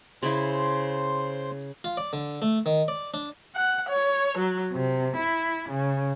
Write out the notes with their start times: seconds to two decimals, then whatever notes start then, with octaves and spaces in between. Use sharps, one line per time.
0.23 C#3 E4 C5 C6
1.84 F4
1.97 D5
2.13 D3
2.42 A3
2.66 D#3
2.88 D5
3.14 D4
3.55 F#5
3.89 C#5
4.38 F#3
4.72 C3
5.15 E4
5.69 C#3